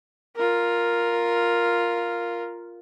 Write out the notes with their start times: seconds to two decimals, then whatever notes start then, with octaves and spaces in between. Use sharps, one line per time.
0.36 F4 A#4